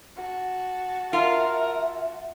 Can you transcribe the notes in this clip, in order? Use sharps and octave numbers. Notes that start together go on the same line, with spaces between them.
F#4 A5
F4 A#4 E5